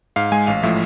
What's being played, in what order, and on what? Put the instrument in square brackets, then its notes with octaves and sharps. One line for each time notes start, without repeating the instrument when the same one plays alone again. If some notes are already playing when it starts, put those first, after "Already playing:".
[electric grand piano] G#2 F5
G#3 G#5
A1 F5
A2 F3 A3 E5